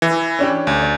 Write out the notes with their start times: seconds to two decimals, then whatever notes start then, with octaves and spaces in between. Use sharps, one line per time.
0.02 E3
0.39 C#4 D4 G4
0.67 D2
0.82 D5